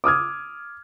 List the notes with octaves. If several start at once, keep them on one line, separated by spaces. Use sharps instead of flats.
D6 D#6 F6 G#6